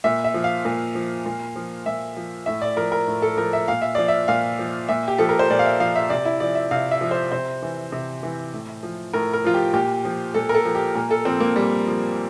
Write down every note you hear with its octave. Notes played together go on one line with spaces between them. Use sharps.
A#2 E5
E5
F3
F5
A#2
F3
A#2
F3
A#2 E5
F3
A2 E5
D5
F3 A#4
A#4
A2
A4
F3 A#4
E5
A#2 F5
E5
F3 D5
E5
A#2 F5
F3
A#2 E5
G4
F3 A4
A#4
C5
A#2 D5
F5
E5
F3 F5
E5
C3 D5
E4
F3 D5
E5
C3 F5
E5
F3
C5
C3 C5
E3
C3
E3
A2
F3
A2 A#4
A#4
F3 F4
G4
A#2 G4
F3
A#2 A4
A#4
A4
F3
G4
A#2 A#4
A4
F3 C4
A#3
A#2 G3
F3